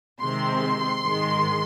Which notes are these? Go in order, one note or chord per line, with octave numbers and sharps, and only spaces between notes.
C3 D#3 G#3 C4 C6
G#2 D#3 G#3